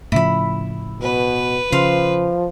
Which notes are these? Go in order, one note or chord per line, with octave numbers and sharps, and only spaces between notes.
A2 C#3 F3 E4 B5
B2 B4
C#3 F3 F5 C6